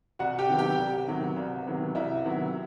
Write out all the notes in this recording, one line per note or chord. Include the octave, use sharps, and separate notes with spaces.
C2 F#4 F#5
G4 G5
C3 D#3 F#3 B3
G4 G5
C2
C3 D#3 F#3 B3
C2
C3 D#3 F#3 B3
C2 E4 E5
C3 D#3 F#3 B3